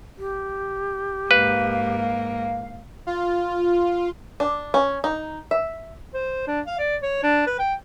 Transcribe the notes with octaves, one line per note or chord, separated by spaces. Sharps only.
G4
G#2 A#3 B4 F5
F4
D4
C#4
D#4
E5
C5
D4
F5
D5
C#5
D4
B4
G5